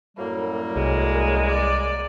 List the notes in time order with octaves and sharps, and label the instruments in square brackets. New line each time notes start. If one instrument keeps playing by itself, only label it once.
[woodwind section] F#2 A2 G3 [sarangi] A#3
[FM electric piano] C2 [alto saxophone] G#3
[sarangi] D5